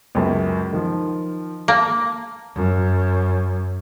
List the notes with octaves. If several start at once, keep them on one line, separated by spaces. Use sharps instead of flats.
C#2 F#2
D#3 F3
A#3 A5
F#2